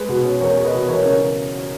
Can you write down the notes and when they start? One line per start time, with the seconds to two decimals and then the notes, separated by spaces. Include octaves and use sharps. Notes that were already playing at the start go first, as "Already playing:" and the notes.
Already playing: G#3 B4
0.09 B2
0.24 C#4
0.41 E2 A#4 C#5
0.57 G#3
0.65 B4 D#5
0.73 B2
0.89 E3 A#4 C#5
1.01 C#3 A#4 C#5